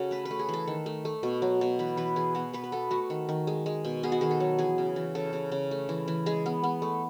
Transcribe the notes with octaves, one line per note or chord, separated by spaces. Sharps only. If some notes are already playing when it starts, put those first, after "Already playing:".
Already playing: C#3 F#4 A4
A3 B4
B4
A3
G#4
E3 A4
D#3
A3
A3
B2
F#3
B2
E3 B4
E3 B4
E3 G#4
B3 F#4
B3 B4
B4
B3 A4
A3 F#4
D#3
D#3
G#3
G#3
B2
B3 G#4
F#4
D#3 G#4
A4
F#3
E3 G#4
C#3
E3
C#3 A4
C#3
C#3
A3
E3
E3
G#3 G#4
B3
B3
A3